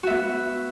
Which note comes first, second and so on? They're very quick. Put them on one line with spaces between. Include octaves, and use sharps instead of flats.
F#4 E5 B3